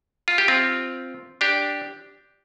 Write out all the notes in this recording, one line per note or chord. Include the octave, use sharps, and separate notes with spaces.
F4
G4
C4 F4
D4 G4